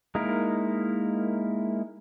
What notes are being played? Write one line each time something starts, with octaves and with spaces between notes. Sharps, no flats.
G#3 A#3 D#4 E4 A#4